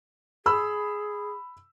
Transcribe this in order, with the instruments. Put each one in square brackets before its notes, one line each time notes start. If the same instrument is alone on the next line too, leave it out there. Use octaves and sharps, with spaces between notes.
[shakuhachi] G#4 [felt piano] B5 E6